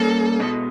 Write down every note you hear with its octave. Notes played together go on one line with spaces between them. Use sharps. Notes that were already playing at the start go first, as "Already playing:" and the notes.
Already playing: G3 A#3 C#4 A4
B2 G#3 B3